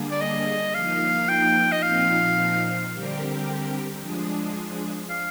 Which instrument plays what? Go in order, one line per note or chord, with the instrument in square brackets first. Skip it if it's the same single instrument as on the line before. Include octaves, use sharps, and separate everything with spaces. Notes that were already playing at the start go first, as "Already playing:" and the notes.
Already playing: [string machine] D3 G3 A#3 D4 G#4
[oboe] D5
D#5
[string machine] F3 A#3 D#4 [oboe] F5
[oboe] G5
D#5
[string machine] A#2 F3 C4 D#4 [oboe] F5
[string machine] D3 G3 C4 G4 A#4
F3 G#3 D4 G#4
[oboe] F5